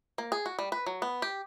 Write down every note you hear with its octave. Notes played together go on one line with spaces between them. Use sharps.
A#3
G#4
F#4
G3
B4
F#3
B3
G4